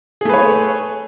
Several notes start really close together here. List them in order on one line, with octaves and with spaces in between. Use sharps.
G#4 A3 B4 C#5